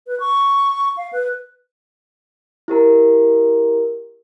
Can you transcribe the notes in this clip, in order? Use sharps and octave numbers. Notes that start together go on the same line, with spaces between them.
B4
C#6
F5
B4
E4 G4 A#4 A#5